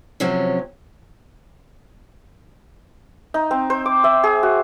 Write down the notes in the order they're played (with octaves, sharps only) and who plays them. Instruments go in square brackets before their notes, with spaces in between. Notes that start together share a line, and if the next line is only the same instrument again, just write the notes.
[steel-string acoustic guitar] C3 F3 F#3 A#3 C#4
[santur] D#4
C4
C5
D6
E5
G#4
F#4